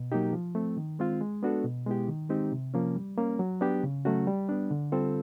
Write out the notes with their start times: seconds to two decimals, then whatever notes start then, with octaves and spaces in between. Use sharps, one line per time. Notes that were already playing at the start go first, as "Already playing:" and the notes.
Already playing: B2
0.12 F#3 A#3 D#4 G4
0.33 F3
0.55 A3 C4
0.77 D#3
0.99 G#3 C4 F4
1.21 G#3
1.43 B3 D4 F#4 A4
1.64 B2
1.86 G#3 B3 E4 G4
2.08 D#3
2.29 G#3 C4 D#4 G4
2.52 C3
2.74 F3 A#3 C#4
2.96 G3
3.18 A#3 C#4
3.39 F#3
3.61 B3 D4 G4
3.83 C#3
4.05 F#3 A3 C#4 F#4
4.27 G3
4.49 B3 D4
4.71 D3
4.92 G3 C4 F4 A4